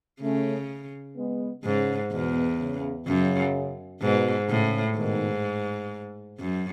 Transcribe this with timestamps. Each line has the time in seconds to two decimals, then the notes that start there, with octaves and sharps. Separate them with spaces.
0.21 C#3 A3 C#4
1.16 G#3 B3
1.64 G#2 C#3
2.11 E2 B2
2.59 C#3
3.07 F#2 C#3
4.02 G#2 B2
4.49 A2 C#3
4.97 G#2 B2 D#3
6.39 F#2